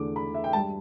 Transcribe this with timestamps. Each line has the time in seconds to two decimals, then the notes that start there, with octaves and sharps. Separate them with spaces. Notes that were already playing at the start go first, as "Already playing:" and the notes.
Already playing: E2 D3 A3 D6
0.16 B5
0.34 E5
0.44 G5
0.53 G2 G3 A5